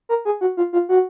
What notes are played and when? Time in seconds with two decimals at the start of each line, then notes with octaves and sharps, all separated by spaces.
0.09 A#4
0.25 G#4
0.41 F#4
0.57 F4
0.73 F4
0.89 F#4